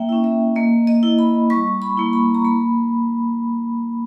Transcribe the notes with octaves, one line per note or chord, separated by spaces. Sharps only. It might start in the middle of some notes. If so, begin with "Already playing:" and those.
Already playing: A#3 E5 G5
C#4 E4
E5
A#3 D#5
D#5
E4
B5
G3 C#6
B5
A#3 E4
B5
A#5
A#3 B5